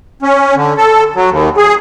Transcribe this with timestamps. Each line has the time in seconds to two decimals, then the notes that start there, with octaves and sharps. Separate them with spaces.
0.22 C#4
0.55 D3
0.77 A4
1.15 F#3
1.30 D#2
1.57 G#4